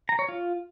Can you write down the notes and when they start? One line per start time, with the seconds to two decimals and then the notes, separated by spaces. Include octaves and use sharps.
0.09 A#5
0.19 C#5
0.29 F4